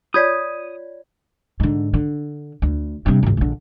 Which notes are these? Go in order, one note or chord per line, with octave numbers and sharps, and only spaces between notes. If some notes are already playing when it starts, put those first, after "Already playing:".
F4 C#5 D5 D#6 G6 G#6 B6
G#2 D3
D3
D2
G2 C3
G#1 C#2
A#1 D3